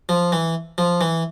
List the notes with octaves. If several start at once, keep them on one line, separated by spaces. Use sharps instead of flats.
F3
E3
F3
E3